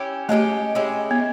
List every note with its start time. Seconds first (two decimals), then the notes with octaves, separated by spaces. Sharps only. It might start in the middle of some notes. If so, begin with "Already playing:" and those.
Already playing: C#4 E4 G4
0.29 G#3 A3 C#4 E4 G4
0.75 G#3 C#4 E4 G4
1.11 B3